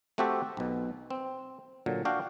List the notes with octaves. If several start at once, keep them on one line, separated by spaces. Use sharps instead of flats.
A3 C4 F#4 G4 A4 E5
B1 B2
C4
A#2 D3 F#3
D4 F#4 F5 G5